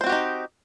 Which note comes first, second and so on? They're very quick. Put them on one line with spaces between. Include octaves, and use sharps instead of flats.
C5 C4 F#4 G4 D#4